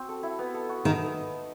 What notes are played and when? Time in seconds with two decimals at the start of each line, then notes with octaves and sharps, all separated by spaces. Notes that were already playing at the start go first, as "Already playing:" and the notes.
Already playing: C4 F#4
0.09 A4
0.23 E4
0.39 B3
0.54 A4
0.69 F#4
0.85 D#3 D#5